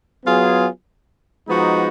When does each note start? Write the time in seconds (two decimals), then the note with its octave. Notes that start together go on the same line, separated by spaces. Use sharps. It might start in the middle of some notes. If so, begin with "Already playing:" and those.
0.23 F#3 B3 F4 G#4
1.46 F3 G#3 B3 D#4 F#4